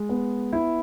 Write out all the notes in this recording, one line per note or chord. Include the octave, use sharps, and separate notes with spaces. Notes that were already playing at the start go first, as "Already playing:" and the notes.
Already playing: G#3
B3
E4